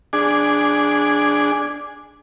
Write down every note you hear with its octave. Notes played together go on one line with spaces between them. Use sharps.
D4 G#4